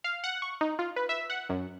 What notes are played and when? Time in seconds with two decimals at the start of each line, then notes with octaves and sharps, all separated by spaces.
0.04 F5
0.24 F#5
0.42 C#6
0.61 D#4
0.79 F4
0.96 B4
1.09 E5
1.30 F#5
1.49 F#2